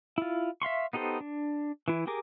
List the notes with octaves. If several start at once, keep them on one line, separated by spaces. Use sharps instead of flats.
E4 F4
E5 F5 C6 C#6
B3 D#4 G4 A4 C5
D4
E3 E4
G4 G#4 A#4 D6